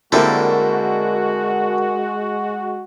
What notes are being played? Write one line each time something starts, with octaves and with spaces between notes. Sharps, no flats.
D3 G3 G#3 A#3 C4 E4 F#4 A#4